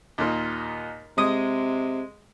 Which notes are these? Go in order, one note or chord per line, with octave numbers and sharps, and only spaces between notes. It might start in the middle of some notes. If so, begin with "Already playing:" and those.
D#2 A#2 D#4
C3 G#3 D#6